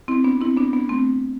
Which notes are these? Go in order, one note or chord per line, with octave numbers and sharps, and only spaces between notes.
C4 E4
B3 D4
C4 E4
B3 D4
B3 D4
A3 C4